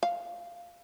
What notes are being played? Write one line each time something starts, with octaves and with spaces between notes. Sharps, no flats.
F5